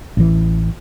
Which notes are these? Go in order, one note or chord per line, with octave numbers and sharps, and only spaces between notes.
A1 E3